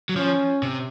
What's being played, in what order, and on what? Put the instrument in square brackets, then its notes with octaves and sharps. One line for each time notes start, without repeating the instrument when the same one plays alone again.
[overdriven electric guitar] F#3
[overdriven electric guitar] F3 [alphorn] C#4
[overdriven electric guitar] C3